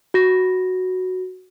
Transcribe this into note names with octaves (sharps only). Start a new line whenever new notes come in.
F#4 A#6